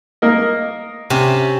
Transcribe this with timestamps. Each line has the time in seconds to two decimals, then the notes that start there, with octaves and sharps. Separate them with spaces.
0.22 A#3 A#4 D#5
1.10 C3 C#4 G4